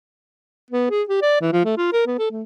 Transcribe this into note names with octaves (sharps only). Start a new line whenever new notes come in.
B3
G#4
G4
D5
E3
F3
A3
F4
A#4
B3
A4
A3